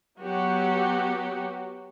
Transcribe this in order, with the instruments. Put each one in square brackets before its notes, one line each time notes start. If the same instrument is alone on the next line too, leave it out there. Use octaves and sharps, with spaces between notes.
[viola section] F#3 B3 F#4 G4